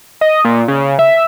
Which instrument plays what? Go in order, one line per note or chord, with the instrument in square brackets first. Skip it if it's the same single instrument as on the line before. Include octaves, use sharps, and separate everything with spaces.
[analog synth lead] D#5
A#2
C#3
E5